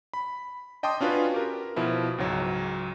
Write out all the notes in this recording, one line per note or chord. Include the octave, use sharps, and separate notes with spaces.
B5
D#5 G5 A5 C6 D6 D#6
C#4 D4 F4 F#4 B4
G4 A#4
B2 F3 E4
C#2 G#2 F#3